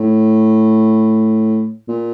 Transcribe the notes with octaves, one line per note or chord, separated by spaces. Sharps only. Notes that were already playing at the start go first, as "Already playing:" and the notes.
Already playing: A2
A#2